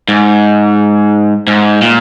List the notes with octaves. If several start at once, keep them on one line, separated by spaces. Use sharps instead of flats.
G#2
G#2
A#2